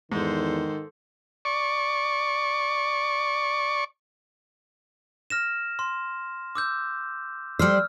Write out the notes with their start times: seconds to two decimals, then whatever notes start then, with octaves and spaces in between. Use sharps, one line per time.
0.12 E2 G#2 D#3 A4 C5
1.45 D5 C#6
5.30 F6 A#6 E7
5.79 C6
6.55 D6 E6 G6
7.59 G3 C5 E6 F6